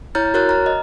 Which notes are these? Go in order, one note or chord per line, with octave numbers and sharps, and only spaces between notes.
E4 C#5 A#5 F6 G6 A6
F#4 A#4 C#5 F6 F#6 A6
A#5 F6
D#5